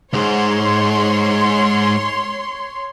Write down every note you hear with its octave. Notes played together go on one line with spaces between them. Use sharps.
C#2 G#2 C#5 C6